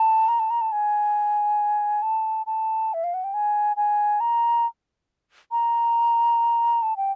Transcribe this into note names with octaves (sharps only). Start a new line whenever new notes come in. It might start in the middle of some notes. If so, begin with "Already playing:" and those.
Already playing: A5
A#5
A5
A#5
A5
G#5
A5
A5
E5
F5
F#5
G5
G#5
G#5
A#5
A#5
A5
G5